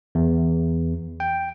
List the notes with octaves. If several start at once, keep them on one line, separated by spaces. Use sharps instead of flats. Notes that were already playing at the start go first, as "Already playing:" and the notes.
E2
G5